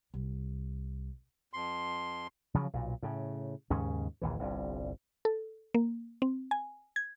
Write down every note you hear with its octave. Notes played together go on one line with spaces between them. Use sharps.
C2
F2 C6
C#3 F3 F#3
B1 A#2
A2 C#3
D#2 G#2 C#3 C#4
A#1 D#2 E3
G1 C2 G2
A4
A#3
C4
G#5
G#6